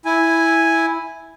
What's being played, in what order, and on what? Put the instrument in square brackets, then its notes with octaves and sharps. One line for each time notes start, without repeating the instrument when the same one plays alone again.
[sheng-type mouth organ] E4 G#5